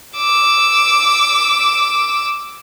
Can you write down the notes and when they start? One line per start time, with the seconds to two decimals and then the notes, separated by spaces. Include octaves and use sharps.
0.17 D6 E6